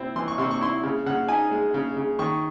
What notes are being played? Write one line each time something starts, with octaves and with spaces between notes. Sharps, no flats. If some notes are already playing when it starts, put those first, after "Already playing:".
Already playing: C3 C4 E4
E3 C6
C#6
C3 C6
C#6
E4 C6
C#3
C#3 F#5
D#4 G#5
G#3
C#3
C#3
D#3 C#6